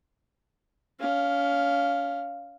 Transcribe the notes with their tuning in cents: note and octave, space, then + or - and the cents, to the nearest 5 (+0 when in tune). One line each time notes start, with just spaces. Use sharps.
C#4 +35 F5 +0